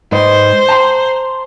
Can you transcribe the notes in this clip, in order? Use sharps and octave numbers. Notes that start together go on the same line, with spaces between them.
G#2 B4 C5 D#5
A5 A#5 C6